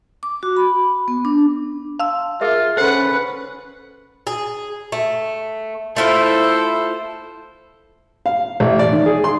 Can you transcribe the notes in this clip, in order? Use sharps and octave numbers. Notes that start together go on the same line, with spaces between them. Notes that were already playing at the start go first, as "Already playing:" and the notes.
D6
F#4
B5
B3
D4
F5 A5 C6 E6
F4 G#4 A#4 E5
C#4 A4 B4 C5 F#5
G#4
A3
A3 E4 F4 A4 C5
F5
A1
D5
D#3
G#4
C6